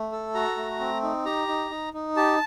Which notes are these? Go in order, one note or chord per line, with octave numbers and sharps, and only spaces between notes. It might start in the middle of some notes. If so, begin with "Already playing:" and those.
Already playing: A3
A4
F#4 A#5
A3
C4
D#4
G4 A#5
D#4
D#4
D#4
G4 A5